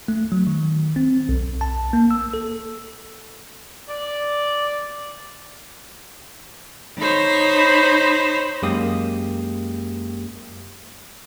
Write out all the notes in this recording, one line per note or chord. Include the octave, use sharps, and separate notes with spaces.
A3
F#3
D#3
C4
B1
A5
A#3
E6
A4
D5
D#4 C5 C#5 B5
F#2 G#3 A#3 G4 D#6